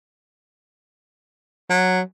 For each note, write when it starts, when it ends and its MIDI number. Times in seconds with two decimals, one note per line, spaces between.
1.70 2.00 54